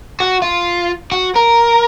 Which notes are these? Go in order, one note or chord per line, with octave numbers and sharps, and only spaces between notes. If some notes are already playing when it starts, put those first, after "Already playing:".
F#4
F4
F#4
A#4